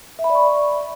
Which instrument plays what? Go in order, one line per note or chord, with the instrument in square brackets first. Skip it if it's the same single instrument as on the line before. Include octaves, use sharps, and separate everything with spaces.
[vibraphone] E5
B5
D5
C#6